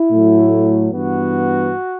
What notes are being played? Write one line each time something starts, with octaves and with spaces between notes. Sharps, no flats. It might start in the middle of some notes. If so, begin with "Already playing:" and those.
Already playing: E4
A2 F#3 A3
G2 E3 B3 F#4